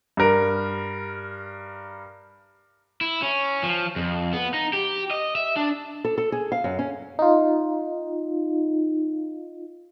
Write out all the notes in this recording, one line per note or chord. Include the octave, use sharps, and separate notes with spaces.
G2 A#4
E4
C#4
F3
F2
B3
D#4
G4
D#5
E5
D4
A4
A4
G#4
F5
F#2
C#4
D#4 F4